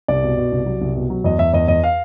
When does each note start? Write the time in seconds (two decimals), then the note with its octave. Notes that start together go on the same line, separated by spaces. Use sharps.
0.08 C2 D5
0.23 B2
0.37 B2
0.52 C2
0.66 F#3
0.81 C2
0.96 B2
1.10 F#3
1.24 E2 D#5
1.39 E2 E5
1.54 E2 D#5
1.68 E2 D#5
1.84 F5